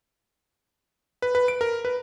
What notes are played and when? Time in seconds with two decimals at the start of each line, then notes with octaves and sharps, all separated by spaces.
1.22 B4
1.35 B4
1.48 D7
1.61 A#4
1.85 B4